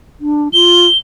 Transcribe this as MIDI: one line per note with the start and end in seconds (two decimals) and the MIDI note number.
0.20 0.48 62
0.53 0.87 65
0.53 0.98 103